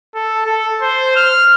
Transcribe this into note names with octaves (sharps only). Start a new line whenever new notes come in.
A4
A4
C5
F6